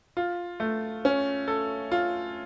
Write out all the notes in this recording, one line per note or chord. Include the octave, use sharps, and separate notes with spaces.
F4
A3
C#4
A4
F4